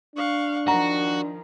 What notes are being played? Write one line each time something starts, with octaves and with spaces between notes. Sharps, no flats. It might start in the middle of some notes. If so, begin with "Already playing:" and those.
D4 F5 C#6 F#6
D#3 F3 F#4 A#5